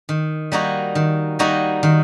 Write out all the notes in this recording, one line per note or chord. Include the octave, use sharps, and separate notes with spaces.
D#3
G3 A#3 D#4 F#4
D#3
G3 A#3 D#4 F#4
D#3